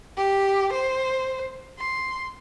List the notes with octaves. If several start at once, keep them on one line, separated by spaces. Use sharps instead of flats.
G4
C5
C6